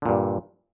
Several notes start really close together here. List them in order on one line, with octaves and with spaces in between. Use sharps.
D3 A#2 G2